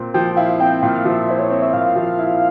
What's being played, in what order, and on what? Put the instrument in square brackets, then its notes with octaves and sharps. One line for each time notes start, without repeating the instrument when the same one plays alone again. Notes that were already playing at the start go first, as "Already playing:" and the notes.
Already playing: [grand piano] A#2 C4
[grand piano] F3 [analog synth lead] G5
[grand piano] E4 [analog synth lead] F5
[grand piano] C4 [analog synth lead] G5
[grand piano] A#2 [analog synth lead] F5
[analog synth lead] F5
[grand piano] F3 [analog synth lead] E5
[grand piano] E4 [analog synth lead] C5
[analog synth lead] C#5
[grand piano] C4
[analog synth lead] E5
[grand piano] A#2 [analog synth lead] F5
[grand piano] F3
E4